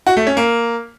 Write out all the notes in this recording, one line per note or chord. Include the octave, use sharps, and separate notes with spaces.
F#4
A3
C#4
A#3